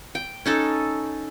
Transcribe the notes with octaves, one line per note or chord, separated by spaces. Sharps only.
G5
C#4 D#4 A4